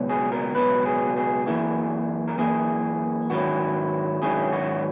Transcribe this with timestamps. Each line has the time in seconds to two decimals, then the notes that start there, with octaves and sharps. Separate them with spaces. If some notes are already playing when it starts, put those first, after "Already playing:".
Already playing: C#2 B2 F#3
0.09 G#4
0.32 A#4
0.55 C#2 B2 F#3 B4
0.85 G#4
1.16 G#4
1.46 F#2 E3 A#3 E4 G#4
2.28 A#4
2.38 F#2 E3 A#3 E4 G#4
3.30 G#2 D#3 F#3 C#4 E4 F#4
4.22 G#2 D#3 F#3 C#4 E4 G#4
4.53 F#4